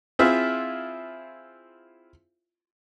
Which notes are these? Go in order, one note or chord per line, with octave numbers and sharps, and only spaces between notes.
C4 E4 F4 G#4 E5